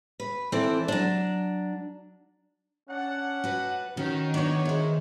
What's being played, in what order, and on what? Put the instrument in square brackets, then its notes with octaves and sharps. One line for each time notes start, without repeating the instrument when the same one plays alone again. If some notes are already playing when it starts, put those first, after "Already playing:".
[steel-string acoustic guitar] B4
E3 C4 A4 D5
F#3 D4
[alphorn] C#4 [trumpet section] D4 F#5
[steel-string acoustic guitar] F#4 B4
[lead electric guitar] D#3 [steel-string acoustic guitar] C#4 [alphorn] F#4
[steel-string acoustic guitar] B3 D4 [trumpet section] C#5
[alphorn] G#3 [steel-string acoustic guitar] E4 C5